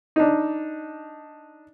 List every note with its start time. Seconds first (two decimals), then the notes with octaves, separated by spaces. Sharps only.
0.16 D4 D#4